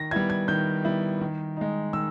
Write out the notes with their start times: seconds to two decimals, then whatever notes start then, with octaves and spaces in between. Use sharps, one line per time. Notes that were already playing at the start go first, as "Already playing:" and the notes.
Already playing: D#3 A#6
0.11 G3 B3 E4 G#6
0.30 G#6
0.48 D#3 G6
0.84 G3 B3 E4
1.21 D#3
1.57 G#3 D#4
1.93 D#3 E6